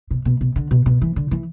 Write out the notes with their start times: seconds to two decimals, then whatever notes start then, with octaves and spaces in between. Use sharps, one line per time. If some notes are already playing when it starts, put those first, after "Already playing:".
0.11 B2
0.25 B2
0.41 B2
0.56 D3
0.71 B2
0.86 B2
1.01 E3
1.16 D3
1.31 E3